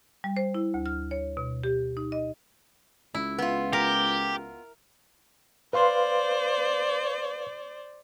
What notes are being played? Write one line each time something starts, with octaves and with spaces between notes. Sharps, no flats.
G3
C5
E4
D2
F6
C#5
B2
G4
D#4
D#5
C#2 E4
B3 F4
G4 A#4
B4 C5 D5 F5 C6